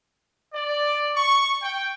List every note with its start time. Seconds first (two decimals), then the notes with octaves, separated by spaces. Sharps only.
0.53 D5
1.16 C#6
1.61 G5